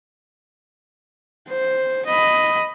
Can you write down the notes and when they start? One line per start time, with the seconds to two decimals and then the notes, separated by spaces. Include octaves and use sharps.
1.49 C5
2.06 D#5 B5